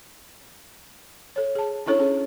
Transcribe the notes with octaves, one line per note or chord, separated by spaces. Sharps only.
A4 C#5
G#4 A5
C#4 D4 E4 A4 C#5
C#4 G#4